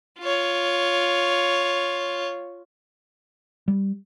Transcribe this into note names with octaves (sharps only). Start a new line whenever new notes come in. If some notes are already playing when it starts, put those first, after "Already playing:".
F4 C#5
G3